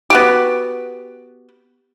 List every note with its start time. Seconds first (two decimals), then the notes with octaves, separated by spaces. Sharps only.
0.10 B3 F#4 G4